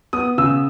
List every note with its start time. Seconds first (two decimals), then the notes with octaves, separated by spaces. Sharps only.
0.13 B3 D#6
0.38 C#3 E6